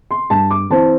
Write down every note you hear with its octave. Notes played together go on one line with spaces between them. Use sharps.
C6
G2 A5
D6
E3 C4 A5